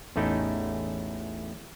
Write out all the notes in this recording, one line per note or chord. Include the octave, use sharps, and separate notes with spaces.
A1 E2 A3 C#4 D#4 E4